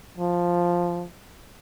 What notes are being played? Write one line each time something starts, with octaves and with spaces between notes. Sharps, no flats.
F3